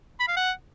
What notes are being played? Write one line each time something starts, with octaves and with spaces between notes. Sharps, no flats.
B5
F5
F#5